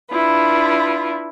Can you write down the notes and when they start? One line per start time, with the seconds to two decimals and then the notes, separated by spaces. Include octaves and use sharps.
0.10 D4 E4 F4 B4